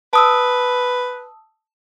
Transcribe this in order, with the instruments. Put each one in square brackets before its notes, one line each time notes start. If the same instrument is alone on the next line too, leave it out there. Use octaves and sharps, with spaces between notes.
[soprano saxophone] B4 [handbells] A5 D#6 E6